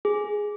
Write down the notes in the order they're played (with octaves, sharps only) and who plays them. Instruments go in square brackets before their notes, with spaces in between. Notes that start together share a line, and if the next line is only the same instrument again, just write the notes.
[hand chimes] G#4